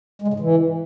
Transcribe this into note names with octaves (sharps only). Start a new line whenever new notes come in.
G#3
C#3
G#2
E3